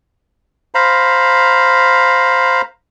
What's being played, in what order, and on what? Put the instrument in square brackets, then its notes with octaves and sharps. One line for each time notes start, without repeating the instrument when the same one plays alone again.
[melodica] C5 F5 A#5 B5